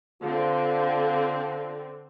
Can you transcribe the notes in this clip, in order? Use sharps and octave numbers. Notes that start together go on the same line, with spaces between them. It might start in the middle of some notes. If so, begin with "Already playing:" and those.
D3 C4 F4